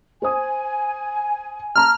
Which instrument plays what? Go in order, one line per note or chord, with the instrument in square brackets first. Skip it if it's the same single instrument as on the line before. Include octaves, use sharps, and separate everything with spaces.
[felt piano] C5 D#6 [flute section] G#5
[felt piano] A5 A#5 [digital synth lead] F6